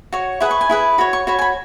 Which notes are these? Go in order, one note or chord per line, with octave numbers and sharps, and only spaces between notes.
F#4 C#5
E4 G#4 B4 F#5
C#6
G#5
E4 G#4 B4
F#4 C#5 B5
C#6
F#4 C#5 B5
G#5
B5